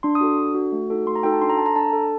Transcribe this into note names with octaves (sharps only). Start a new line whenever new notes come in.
D4 C6
D#6
F#4 A4
D4
F#4 A4
A3
D#4 F#4 A4
A3 C6
A#5
D#4 F#4 A4 G5
A5
D4 C6
A#5
A4 A5
A#5
D4 A5
A4